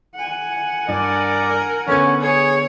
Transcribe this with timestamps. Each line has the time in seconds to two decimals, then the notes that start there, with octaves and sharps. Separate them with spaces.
0.14 F#5 G#5
0.88 G2 A#4 D5
1.87 D3 B3 C#4 G#6
2.22 G#4 C#5